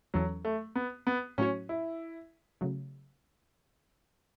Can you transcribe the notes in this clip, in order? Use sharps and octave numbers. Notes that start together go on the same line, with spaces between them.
E2 E3 F#3 C#4 A4
A3
B3
B3
A2 F#3 A3 C#4 F#4 C#5
E4
C#3 F#3 A3